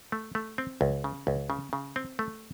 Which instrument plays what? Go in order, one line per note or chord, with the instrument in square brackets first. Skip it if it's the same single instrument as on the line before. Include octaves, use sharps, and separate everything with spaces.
[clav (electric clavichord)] A3
A3
C4
C#2
C#3
C#2
C#3
C#3
C4
A3